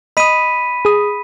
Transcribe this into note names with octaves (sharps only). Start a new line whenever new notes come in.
D#5 B5 D#6 B6 D#7
G#4 D#6